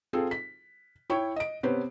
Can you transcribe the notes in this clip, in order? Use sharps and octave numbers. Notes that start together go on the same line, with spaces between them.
C4 F4 G#4 A4
B6
E4 C#5 G5 C#6
D#5 D7
C3 B3 C#4 B4 C5